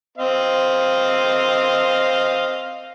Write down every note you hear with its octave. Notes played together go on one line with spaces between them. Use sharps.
C4 D#5 F5